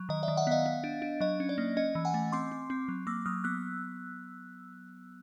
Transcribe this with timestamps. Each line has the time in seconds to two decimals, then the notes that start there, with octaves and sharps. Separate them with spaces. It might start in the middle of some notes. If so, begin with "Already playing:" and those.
Already playing: F#3
0.09 D#3 D#5
0.23 D5 E5
0.28 D#3
0.37 E5 F#5
0.47 B3 D#5 F5
0.66 B3
0.84 D4
1.02 D4
1.20 F#3 D#5
1.40 C#4
1.49 D5
1.58 A#3
1.77 C#4 D#5
1.95 E3
2.05 F#5 G#5
2.14 A3
2.32 C4 C6 D6
2.52 C4
2.70 C4
2.88 F#3
3.07 A#3 D6 E6
3.26 F#3 D#6 F6
3.44 B3 E6 F#6